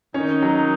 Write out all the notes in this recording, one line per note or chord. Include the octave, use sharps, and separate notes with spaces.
D#3 C#4 D#4
F#3